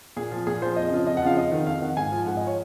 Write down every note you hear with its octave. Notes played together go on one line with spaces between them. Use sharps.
A#2 G#4
F3
A#2 G#4
F3 C5
F2 D#5
C#3 F3
F2 D#5
F#5
C#3 F3 F5
F2 D#5
D#3
F2 F5
D#3 F#5
G#2 G#5
F3
G#2 F#5
D#5
F3
C#5